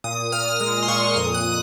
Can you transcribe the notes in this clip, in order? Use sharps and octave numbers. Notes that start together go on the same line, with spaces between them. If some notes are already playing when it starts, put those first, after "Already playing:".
A#2 D#6
A#2 F6
G#3 F6
C6
A#2 C#6
F2 D#6
F#6